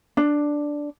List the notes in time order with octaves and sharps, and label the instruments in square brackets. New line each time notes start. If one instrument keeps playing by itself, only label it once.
[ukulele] D4